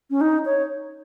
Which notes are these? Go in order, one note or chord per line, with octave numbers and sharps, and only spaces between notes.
C#4
D#4
C#5